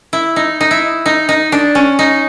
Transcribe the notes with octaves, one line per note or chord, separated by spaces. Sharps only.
E4
D#4
D#4
E4
D#4
D#4
D4
C#4
D#4